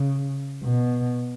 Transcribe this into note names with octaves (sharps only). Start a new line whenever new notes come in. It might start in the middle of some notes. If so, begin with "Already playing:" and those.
Already playing: C#3
B2